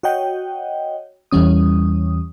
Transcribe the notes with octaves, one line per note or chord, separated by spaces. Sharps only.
F#4 C#5 D#5 F#5 G5
E2 E3 G3 C#4 D#6